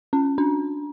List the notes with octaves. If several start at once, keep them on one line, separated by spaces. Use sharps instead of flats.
C#4
D4